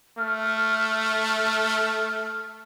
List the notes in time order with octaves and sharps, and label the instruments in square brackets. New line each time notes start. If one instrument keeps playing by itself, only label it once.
[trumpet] A3 [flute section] F6